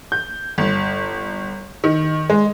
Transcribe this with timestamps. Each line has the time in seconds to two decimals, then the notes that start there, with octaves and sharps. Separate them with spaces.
0.12 G6
0.58 G1
1.84 D#3
2.30 G#3